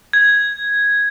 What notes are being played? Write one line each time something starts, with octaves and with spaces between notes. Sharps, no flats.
G#6